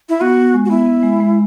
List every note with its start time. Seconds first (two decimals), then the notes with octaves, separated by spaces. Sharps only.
0.09 E4
0.21 B3 F#4
0.37 B3
0.54 G#3
0.65 F#4
0.70 B3 E4
0.86 B3
1.03 G#3
1.20 G#3